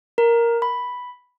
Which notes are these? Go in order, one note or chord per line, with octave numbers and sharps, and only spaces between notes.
A#4
B5